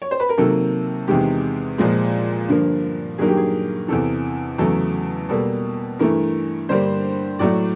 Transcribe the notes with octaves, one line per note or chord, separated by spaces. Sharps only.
C#5
C5
B4
A#4
C3 D#3 F#3 A#3 A4
E2 C3 D#3 G#3 G4
A#2 F3 G#3
G2 D3 F3 A#3
G2 D#3 F#3 A#3 G#4
G4
G#4
E2 C3 E3 A4
E2 C#3 F#3 A3 A4
B2 G3 A#3 A4
G2 E3 A3 A#4
G2 D3 G3 A#3 C5
A2 F#3 A3 D5